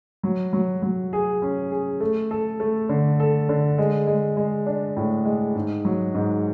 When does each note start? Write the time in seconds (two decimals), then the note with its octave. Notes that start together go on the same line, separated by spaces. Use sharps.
0.23 F#3
0.53 F#3
0.82 F#3
1.13 G#4
1.42 C#4
1.71 G#4
2.00 A3
2.31 A4
2.60 A3
2.89 D3
3.20 A4
3.49 D3
3.78 G#3
4.07 G#3
4.37 G#3
4.67 D4
4.97 A2
5.25 G#3
5.55 G#2
5.85 F#3
6.14 G#2